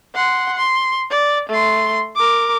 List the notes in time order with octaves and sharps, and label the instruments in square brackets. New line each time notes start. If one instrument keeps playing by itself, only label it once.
[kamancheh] F#5 C6
C6
D5
A3 C6
A#4 D6